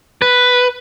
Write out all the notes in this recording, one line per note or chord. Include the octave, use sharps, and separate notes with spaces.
B4